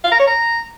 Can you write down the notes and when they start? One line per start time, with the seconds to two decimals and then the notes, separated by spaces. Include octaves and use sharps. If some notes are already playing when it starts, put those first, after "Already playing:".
0.04 F5
0.12 A#5
0.19 C#5
0.27 A#5